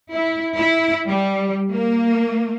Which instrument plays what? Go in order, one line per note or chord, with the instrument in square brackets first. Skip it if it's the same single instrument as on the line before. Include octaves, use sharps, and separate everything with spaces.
[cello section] E4
E4
G3
A#3